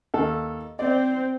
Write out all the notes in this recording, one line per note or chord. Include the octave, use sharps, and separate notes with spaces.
D#2 A4
C4 C5 D5